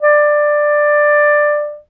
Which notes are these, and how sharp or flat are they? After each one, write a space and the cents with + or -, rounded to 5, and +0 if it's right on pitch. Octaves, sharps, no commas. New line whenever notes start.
D5 +10